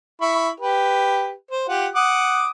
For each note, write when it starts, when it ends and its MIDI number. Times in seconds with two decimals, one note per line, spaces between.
0.21 0.49 64
0.21 0.49 83
0.21 0.49 85
0.60 1.32 67
0.60 1.32 71
1.51 1.66 72
1.68 1.87 65
1.68 1.87 67
1.68 1.87 78
1.95 2.49 78
1.95 2.49 86
1.95 2.49 87